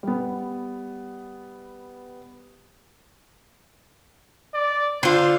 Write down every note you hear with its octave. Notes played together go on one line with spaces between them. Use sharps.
G3 B3
D5
D3 F4 C5